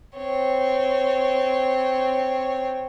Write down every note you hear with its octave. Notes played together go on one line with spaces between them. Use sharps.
C4 C#5